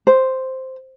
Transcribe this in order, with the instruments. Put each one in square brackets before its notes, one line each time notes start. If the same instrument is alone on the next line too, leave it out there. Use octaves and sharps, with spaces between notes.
[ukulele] C5